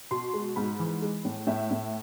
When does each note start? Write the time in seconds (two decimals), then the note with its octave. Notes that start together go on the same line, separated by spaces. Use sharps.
0.11 B2 C6
0.34 G#3
0.56 G#2 B5
0.79 E3
1.02 G#3
1.25 A2
1.47 A2 E5
1.71 A2